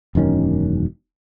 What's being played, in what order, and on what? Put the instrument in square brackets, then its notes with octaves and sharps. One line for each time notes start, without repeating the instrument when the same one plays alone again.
[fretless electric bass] E1 F#2 D#3 C#4